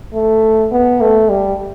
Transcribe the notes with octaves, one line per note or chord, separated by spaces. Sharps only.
A3
B3
A3
G3